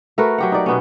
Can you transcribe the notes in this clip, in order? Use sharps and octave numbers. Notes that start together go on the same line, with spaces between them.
A3 F#4 A#4 B4
F#3 G4 F#5
D#4 D5
B2 B3 C#4